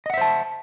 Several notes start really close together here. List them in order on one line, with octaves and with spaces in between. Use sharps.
D#5 F#5 E5 C5 A5